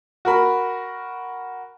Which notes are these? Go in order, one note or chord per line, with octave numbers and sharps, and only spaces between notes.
F#4 A#4 B5